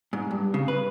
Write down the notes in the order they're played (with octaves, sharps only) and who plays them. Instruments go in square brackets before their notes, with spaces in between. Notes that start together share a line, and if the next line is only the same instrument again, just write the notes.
[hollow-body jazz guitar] G#2
G2
C#3
B4